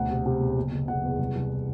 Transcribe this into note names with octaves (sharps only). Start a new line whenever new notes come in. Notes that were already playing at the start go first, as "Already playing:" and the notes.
Already playing: E1 D2 F#5
C3
C3
E1
F#1
F#1
F#1 F#5
E2
C2
C2